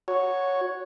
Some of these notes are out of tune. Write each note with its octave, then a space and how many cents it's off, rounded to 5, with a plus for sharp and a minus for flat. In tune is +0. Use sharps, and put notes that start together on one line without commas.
F#4 -10 C#5 +0